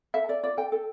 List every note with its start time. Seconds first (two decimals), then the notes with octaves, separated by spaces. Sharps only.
0.14 A4 E5
0.28 A4 D5
0.43 F4 D5
0.57 A4 G5
0.72 A4